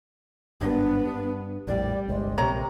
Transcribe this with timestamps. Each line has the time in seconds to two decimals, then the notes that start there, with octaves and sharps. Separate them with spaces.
0.61 G1 G#2 G3 B3 D4
1.06 G2
1.67 A#1 F2 A2 G3 D5
2.08 G1 C2 G#3
2.38 A#1 C3 C#5 A#5